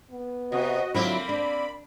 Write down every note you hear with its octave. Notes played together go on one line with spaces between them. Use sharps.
B3
C3 F#4 D#5
D3 F#3 A#3 C4 E4 F4 A#4 B5
D4 D5